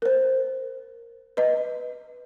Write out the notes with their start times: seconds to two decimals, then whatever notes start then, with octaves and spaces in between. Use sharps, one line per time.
0.02 A#4 C5
1.37 B4 D#5